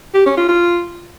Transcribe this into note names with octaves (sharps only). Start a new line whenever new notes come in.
G4
C#4
F4
F4